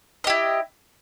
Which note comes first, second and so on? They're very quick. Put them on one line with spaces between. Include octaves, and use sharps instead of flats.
D#5 G4 E4